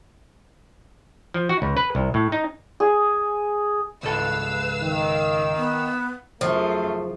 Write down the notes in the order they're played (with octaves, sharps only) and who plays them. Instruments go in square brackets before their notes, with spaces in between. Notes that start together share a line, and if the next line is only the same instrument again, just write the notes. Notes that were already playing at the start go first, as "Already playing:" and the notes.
[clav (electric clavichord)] F3
F#4
C#2
B4
C2
A2
D#4
[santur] G#4
[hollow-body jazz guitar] C#2 G#2 A4 [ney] B4 [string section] F5 E6
[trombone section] D#3
[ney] B3
[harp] F#1 F#3 D#6 [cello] F#2 F4 [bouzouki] F3 [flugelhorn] A3